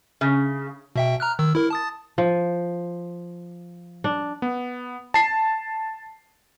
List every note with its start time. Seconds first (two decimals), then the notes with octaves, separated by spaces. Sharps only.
0.21 C#3
0.96 B2 E5 G5
1.20 A#5 F6 F#6
1.39 D#3 E6
1.55 E4 A#4
1.70 A5 D#6 A6
2.18 F3
4.04 D4
4.42 B3
5.14 A5 C7